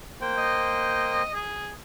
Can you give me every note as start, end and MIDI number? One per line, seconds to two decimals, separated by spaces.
0.21 1.22 58
0.21 1.22 72
0.21 1.22 79
0.38 1.34 75
1.34 1.71 68